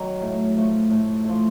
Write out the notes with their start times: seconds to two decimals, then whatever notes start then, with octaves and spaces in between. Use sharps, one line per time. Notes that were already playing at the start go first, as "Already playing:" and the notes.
Already playing: D#3 F#3
0.22 A2
0.56 F3 A3
0.91 A2
1.24 F3 A3